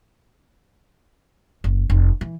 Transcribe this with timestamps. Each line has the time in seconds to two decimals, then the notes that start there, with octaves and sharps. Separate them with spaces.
1.64 F#1
1.90 F1
2.21 E3